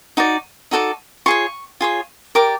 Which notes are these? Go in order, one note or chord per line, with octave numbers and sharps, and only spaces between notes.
D#4 F#4 D5
D#4 F#4 A4 D5
F4 G#4 C#5 C#6
F4 G#4 C#5
G4 A#4 D5 D6